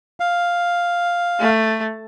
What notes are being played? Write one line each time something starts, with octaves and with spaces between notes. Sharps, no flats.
F5
A3